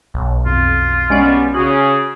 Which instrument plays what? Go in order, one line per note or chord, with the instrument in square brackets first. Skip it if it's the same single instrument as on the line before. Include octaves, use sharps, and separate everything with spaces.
[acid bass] B1
[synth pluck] F2 [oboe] F4
[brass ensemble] G3 B3 [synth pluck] G#3 C#4 D5
[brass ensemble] C#3 [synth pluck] F#4 [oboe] G#4